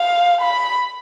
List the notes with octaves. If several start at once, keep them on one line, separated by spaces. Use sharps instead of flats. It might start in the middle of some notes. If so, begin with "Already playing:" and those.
Already playing: F5
B5